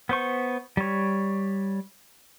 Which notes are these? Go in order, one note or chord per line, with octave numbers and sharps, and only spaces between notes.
B3 C5 C#6
G3 C#5